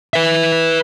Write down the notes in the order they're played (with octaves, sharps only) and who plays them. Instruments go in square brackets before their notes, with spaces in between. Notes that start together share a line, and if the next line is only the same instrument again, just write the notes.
[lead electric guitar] B4 E5